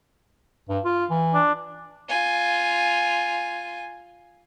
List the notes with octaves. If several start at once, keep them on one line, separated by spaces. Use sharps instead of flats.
G2
F4
E3
D4
F4 G#5